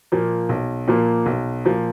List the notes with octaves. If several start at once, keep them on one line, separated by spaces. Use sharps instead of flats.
A#2 F3 A#3
B1
A#2 F3 A#3
B1
A#2 F3 A#3